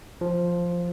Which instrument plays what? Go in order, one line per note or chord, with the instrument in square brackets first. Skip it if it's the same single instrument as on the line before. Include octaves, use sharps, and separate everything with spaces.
[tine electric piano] F3